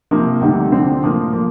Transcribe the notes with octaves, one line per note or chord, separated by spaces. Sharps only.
C3 F3 A#3
D2 C3 D#3 G3
D3 F3 C4
A2 F3 A#3
F3 A#3